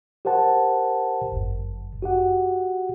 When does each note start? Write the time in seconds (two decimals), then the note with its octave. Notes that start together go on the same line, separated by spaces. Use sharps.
0.25 G4 A#4 C5 F#5 A5
1.32 G1 F#2
2.02 F#4 G4 F#5